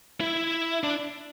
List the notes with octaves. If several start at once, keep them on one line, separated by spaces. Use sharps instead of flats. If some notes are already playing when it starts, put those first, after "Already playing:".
E4
D4